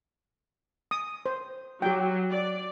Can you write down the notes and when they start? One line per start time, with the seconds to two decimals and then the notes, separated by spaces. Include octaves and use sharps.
0.91 D#6
1.26 C5
1.82 F#3 G4 G5
2.30 D5